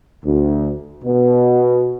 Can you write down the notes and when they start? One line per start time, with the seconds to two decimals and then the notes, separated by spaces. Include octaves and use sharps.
0.25 D2
1.04 B2